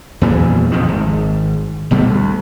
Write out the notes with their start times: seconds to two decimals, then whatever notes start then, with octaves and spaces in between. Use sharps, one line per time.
0.21 E2 A#2 E3 F#3
0.72 G1 F2 C3 D#3
0.88 G#1
1.91 G1 B2 G3 A3
2.08 D2